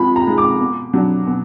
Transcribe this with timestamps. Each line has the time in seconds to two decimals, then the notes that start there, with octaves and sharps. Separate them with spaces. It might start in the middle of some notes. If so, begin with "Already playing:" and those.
Already playing: F3 G#3 B5
0.16 A#5
0.27 G#3 D#4
0.38 D6
0.60 B2
0.94 F#3 D4
1.27 B2